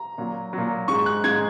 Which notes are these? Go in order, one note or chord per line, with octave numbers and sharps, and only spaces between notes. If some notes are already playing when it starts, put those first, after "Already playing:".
Already playing: A#5
A#2 F#3
A#2 F#3
G#2 G#3 C#6
F#6
G#2 G#3 G#6